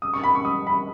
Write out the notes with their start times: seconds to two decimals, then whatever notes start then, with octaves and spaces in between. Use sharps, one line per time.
0.02 D#6
0.13 C#6
0.23 B5
0.35 C#6
0.45 D#6
0.67 B5